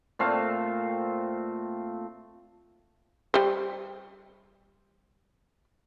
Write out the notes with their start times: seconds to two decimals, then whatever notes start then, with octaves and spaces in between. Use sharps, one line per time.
0.19 A#2 A3 C4 F5
3.34 G3 C5